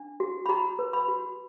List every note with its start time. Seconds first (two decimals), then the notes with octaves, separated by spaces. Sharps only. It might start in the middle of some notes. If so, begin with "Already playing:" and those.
Already playing: D4
0.20 F#4
0.46 B5
0.49 F#4 A#5
0.79 B4
0.93 B5
1.08 F#4